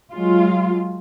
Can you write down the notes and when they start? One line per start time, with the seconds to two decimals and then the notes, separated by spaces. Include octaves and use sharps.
0.12 F#3 G#3 F4